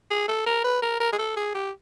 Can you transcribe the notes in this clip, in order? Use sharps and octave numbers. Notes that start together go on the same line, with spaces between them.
G#4
A4
A#4
B4
A#4
A#4
G#4
A4
G#4
G4